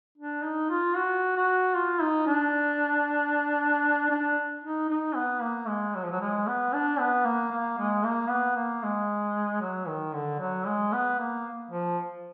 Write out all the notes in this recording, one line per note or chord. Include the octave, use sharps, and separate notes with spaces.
D4
D#4
F4
F#4
F#4
F4
D#4
D4
D4
D#4
D#4
B3
A#3
G#3
F#3
F3
F#3
G#3
B3
D4
B3
A#3
A#3
G#3
A#3
B3
A#3
G#3
F#3
D#3
D3
F#3
G#3
B3
A#3
F3